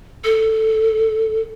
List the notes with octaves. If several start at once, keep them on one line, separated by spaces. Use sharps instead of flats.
A4